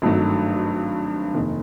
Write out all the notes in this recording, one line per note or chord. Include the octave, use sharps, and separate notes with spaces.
G#1 G2 D#3 F#3 A3
F1 D#2 D#3